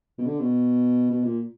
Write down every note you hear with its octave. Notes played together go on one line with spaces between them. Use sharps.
B2
D3
B2
B2
A#2